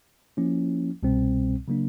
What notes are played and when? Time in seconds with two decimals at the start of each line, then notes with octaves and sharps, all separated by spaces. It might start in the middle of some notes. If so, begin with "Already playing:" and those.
0.37 F3 A#3 C#4 E4
1.03 C2 B2 G3 C4
1.68 C#3 F#3 A#3 D4